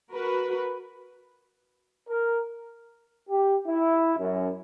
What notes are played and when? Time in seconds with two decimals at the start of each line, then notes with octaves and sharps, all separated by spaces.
0.11 F#4 A#4 B4
2.08 A#4
3.28 G4
3.66 E4
4.17 F#2